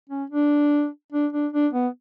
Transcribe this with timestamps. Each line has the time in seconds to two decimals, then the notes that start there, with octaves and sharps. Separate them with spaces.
0.09 C#4
0.30 D4
1.12 D4
1.33 D4
1.53 D4
1.73 B3